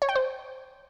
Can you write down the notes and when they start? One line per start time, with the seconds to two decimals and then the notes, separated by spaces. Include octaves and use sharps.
0.02 C#5
0.09 G5
0.15 C5